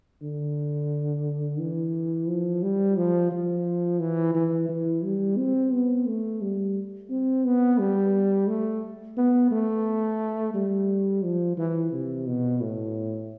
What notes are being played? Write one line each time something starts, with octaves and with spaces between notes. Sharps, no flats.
D3
E3
F3
G3
F3
F3
E3
E3
E3
G3
C4
B3
A3
G3
C4
B3
G3
A3
B3
A3
G3
F3
E3
C3
B2
A2